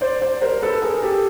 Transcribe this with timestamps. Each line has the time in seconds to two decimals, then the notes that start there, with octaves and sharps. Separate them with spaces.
0.01 C5 D5
0.21 C5 D5
0.41 A#4 C5
0.62 A4 B4
0.82 G#4 A#4
1.02 G4 A4